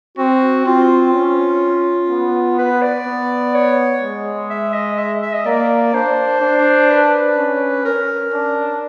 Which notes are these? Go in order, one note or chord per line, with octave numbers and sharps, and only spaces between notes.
C4 F#4
C4 F4
C#4
B3
B4
D5
B3
C#5
G#3
E5
D#5
E5
E5
D#5
A#3 D5
D4 C5
D4
B4
C#4
C#4 A#4
D4